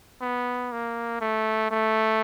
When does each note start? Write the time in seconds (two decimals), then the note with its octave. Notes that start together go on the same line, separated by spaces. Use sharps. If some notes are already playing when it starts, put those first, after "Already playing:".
0.21 B3
0.72 A#3
1.21 A3
1.71 A3